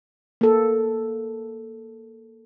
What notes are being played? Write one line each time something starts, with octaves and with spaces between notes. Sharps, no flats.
A#3 A4